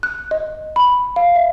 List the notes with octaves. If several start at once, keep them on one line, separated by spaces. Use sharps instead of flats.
F#6
D#5
B5
F5
E5